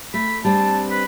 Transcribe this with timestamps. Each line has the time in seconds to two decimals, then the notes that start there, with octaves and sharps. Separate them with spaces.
0.14 A3 B5
0.45 G3 C4 D4 A5
0.90 B4